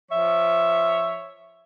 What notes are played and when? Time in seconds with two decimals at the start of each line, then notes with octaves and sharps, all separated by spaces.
0.11 F3 C#5 E5